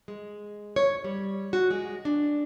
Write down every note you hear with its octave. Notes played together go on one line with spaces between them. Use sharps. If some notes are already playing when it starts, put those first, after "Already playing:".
G#3
C#5
G3
F#4
G#3
D4